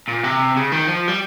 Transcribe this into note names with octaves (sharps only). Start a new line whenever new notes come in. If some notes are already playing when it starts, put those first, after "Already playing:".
A#2
C3
C#3
D#3
F3
G3